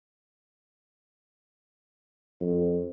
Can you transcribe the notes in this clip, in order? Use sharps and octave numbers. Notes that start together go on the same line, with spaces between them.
F2